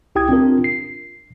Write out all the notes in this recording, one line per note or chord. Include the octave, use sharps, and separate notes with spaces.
C2 E4 G4 G5 D#6 G#6
C4 D4 F4 A#4
C7